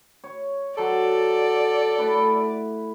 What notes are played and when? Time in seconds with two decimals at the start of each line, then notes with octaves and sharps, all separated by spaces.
0.24 C#5
0.78 F#3 A4 C5 D5
1.98 A3 E4 B4